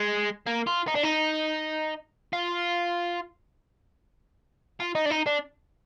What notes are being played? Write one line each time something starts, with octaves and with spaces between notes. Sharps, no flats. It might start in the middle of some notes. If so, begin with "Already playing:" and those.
Already playing: G#3
A#3
F4
D#4
D4
D#4
F4
F4
D#4
D4
D#4
D4